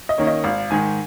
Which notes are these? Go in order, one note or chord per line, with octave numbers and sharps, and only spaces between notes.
D#5
D#3 A#3 C#4
D#5
G#1 F5
G#2 D#3 G#5